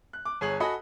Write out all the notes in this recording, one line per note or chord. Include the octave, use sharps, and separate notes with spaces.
F#6
D6
G1 G#4 C#5 F#7
F#4 A4 D#5 G#5 B5